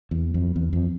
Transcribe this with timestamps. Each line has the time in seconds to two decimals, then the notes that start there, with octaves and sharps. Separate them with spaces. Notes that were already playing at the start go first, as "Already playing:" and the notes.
0.11 E2
0.34 F2
0.56 E2
0.73 F2